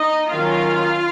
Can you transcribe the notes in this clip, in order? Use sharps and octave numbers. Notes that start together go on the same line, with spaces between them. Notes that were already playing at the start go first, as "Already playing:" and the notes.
Already playing: D#4 D#5
D#3 F#3 C#4 F4 F5